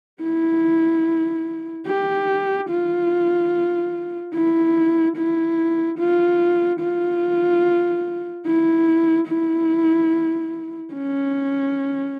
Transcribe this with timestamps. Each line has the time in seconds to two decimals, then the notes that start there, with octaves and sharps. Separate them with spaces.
0.23 E4
1.87 G4
2.70 F4
4.34 E4
5.17 E4
5.98 F4
6.81 F4
8.46 E4
9.28 E4
10.93 C#4